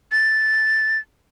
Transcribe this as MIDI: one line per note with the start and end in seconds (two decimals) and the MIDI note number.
0.12 0.98 93